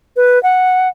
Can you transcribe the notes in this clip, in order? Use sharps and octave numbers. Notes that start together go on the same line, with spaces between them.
B4
F#5